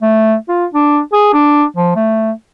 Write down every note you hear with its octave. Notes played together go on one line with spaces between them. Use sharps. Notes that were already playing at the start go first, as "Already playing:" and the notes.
A3
F4
D4
G#4
D4
F3
A3